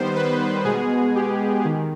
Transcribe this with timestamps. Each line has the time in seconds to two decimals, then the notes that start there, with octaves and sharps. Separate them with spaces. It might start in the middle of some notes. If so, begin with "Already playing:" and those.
Already playing: D#3 G3 B3 C5
0.15 B4
0.65 B2 G#3 B3 G#4
1.15 G4
1.65 D#3